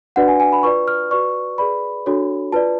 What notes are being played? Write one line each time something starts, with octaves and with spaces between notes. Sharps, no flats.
D4 F#4 B4 D5 F#5
G#5
G#5
B5
F4 B4 D5 C#6
F6
F#4 B4 D5 C#6
G#4 B4 D5 B5
D4 F#4 A4 C#5
F4 B4 D5 A5